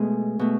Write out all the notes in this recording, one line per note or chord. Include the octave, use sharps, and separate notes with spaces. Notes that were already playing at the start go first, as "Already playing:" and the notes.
Already playing: B2 G#3 A3 G#4
B2 A3